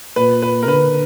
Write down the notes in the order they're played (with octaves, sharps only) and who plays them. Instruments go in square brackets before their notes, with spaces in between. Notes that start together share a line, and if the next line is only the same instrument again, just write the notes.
[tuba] A#2 [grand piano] B4
[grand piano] B4
A#4
[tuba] D3 [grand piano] B4